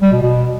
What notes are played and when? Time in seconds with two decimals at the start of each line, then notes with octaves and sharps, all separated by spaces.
0.02 G3
0.12 B2
0.22 B2